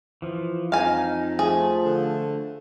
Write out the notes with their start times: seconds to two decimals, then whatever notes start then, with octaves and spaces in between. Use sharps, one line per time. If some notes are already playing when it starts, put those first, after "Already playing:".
0.22 E3 F3
0.72 F2 D#4 F5 G#5
1.39 F3 A3 G#4
1.84 D3